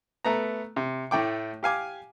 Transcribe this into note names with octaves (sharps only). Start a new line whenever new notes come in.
A3 B3 A#5
C3
A2 A3 G5 D6
G4 F5 G#5 D6